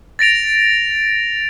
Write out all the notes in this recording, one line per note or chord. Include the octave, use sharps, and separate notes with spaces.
A6 A#6 D7 F7